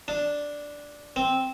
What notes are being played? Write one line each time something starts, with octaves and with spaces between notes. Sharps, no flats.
D4
C4